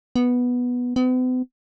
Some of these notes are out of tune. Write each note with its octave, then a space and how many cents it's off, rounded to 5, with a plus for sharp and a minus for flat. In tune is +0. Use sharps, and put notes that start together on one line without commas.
B3 -5
B3 +45